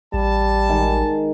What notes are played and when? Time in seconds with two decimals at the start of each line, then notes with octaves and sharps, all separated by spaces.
0.14 A1 G3 A5
0.69 D#3 G#3